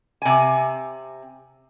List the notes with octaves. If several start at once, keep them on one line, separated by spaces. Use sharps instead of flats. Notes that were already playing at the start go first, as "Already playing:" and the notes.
C3 G#5